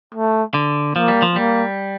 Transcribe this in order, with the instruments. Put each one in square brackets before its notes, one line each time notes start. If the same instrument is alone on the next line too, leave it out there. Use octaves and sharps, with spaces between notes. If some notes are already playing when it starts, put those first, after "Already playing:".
[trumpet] A3
[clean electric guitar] D3
[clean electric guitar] F3 [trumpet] A#3
[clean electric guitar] G3
F3
[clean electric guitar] G3 [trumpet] A#3